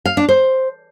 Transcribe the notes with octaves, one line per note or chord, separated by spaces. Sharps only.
F5
D4
C5